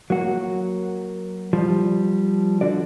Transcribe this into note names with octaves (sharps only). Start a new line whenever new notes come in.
F#3 A#3 F#4
F3 G3
D3 F#4 D5